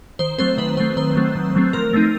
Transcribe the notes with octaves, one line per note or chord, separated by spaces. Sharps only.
D#3 C5
F#3 A3 C4 C5
D#3 B4
F#3 A3 C4 C5
D#3 C5
F#3 A3 C4
D#3
F#3 A3 C4
F3 A#4
A3 C4 D#4